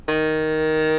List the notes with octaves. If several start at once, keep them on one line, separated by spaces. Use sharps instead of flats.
D#3